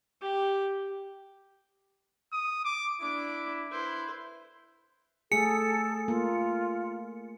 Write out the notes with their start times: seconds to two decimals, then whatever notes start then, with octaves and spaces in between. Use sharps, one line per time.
0.22 G4
2.33 D#6
2.65 D6
3.01 D4 E4 D6
3.71 E4 B4 C5
5.32 A3 G#4 A4 C#7
6.08 A#3 F4